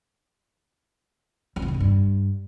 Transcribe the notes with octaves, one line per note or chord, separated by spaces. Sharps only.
F2
E3
D#3
D3
G2